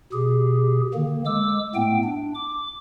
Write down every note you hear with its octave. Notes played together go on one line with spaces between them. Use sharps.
B2 G4 G#4
D3 D#3 A#3
G#3 D6 E6
A2 A3 B3 G5
D4
D6